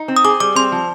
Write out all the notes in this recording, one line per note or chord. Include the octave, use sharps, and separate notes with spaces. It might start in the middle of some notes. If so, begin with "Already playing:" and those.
Already playing: D#4
C4
D#6
G#4 D6
G3 D6
C4 C6
F3